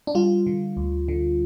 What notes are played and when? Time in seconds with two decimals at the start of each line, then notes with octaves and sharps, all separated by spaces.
0.07 D4
0.15 G3 F4
0.46 D3
0.77 D2
1.08 D3